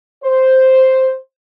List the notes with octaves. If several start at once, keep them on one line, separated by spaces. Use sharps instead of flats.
C5